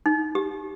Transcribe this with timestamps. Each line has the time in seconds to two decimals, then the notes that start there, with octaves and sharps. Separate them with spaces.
0.06 D#4
0.35 G4